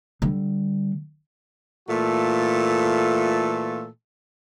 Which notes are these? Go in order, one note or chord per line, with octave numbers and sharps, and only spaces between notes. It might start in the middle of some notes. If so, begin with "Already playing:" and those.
D3 G3
A#2 E3 A3 F4 A4